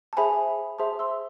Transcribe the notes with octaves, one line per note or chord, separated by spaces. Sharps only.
A5
G#4 C5 E5 G#5 B5
G#4 C5 E5 A5 C6
C6 E6